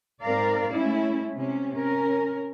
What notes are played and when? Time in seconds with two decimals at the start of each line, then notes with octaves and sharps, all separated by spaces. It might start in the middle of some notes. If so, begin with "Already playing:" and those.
0.22 G#2 C4 A#4 D5 F5
0.72 G#3 A3 C#4 E4
1.36 C3 C#4
1.75 C#4 A#4